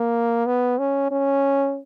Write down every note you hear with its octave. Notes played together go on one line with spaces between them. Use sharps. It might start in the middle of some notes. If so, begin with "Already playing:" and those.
Already playing: A#3
B3
C#4
C#4